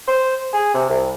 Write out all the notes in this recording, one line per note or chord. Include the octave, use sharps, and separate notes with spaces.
C5
G#4
C3
C2